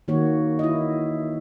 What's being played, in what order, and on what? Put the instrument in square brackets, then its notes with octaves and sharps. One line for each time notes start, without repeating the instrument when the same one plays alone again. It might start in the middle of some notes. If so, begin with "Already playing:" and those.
[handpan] D#3 A#3 F#4 C#5
E4 D#5